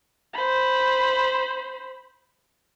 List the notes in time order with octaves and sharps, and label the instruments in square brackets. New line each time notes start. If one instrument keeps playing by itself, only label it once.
[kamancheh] C5 B5